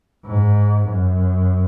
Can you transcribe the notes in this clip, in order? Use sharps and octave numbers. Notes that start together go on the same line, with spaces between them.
G#2
F#2